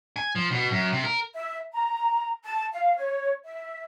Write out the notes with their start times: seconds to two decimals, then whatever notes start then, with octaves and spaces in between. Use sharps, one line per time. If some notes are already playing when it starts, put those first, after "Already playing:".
0.16 G#5
0.36 F3
0.51 B2
0.71 F#2
0.92 C3
1.04 A#4
1.34 E5
1.72 A#5
2.44 A5
2.72 F5
2.97 C#5
3.44 E5